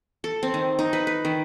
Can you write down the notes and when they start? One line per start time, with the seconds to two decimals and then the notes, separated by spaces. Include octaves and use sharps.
0.24 A4
0.43 C4
0.54 D#3
0.79 D#4
0.93 B4
1.07 B4
1.25 D#3